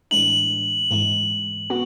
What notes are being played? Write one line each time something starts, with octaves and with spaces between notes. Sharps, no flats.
A2 E3 G#3 D4 F#7
G#2 E3 G#3
B3 F#4